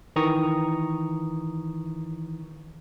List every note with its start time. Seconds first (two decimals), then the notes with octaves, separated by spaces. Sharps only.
0.16 D#3 E3 A#5 C#6 D#6